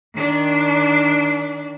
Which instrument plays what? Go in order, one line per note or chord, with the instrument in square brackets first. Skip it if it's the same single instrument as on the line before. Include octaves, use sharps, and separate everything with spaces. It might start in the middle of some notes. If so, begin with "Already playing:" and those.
[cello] D#3 D4